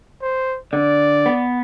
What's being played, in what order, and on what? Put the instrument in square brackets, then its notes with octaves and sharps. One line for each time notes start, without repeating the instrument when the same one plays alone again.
[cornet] C5
[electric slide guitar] D3 [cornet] D5
[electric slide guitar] B3